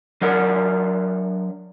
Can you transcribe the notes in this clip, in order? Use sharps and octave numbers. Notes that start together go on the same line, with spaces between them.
F#3 D4 A#4 C#5 F#5